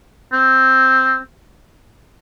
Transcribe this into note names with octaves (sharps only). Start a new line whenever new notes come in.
C4